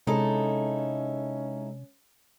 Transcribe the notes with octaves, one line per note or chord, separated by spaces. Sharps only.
C3 G#3 C#4 D#4 E4 A4